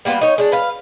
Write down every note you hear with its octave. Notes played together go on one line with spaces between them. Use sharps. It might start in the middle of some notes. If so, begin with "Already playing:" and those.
G3 A#3 B3 F4
D#4 C#5
G#3 D4
B4 F5